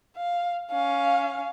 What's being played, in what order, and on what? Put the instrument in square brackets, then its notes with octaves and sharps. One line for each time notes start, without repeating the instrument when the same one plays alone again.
[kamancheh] F5
C#4 F5